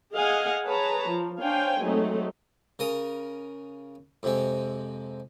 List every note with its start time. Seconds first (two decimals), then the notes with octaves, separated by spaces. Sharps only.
0.14 G#4 D#5 F5 F#5 G#5
0.67 G#4 B4 C#5 A5 A#5
1.08 F3
1.42 D4 C5 C#5 F5 G5 G#5
1.82 F#3 G#3 A3 C4 D#4
2.79 C#3 A#4 D#6
4.23 F2 C3 G#3